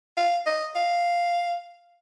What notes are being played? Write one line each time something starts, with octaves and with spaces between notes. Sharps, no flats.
F5
D#5
F5